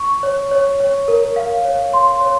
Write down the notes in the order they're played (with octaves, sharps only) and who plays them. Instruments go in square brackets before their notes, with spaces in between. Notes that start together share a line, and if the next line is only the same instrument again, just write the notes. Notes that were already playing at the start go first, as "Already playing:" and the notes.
Already playing: [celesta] C#6
C#5
C#5
C#5
A#4
F5
C#5
C6
C#5